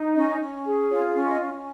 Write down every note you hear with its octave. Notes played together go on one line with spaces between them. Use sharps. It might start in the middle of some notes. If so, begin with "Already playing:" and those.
Already playing: D#4
C#4 D#5
C#4
G#4
F4 C#5
C#4
D#5
C#4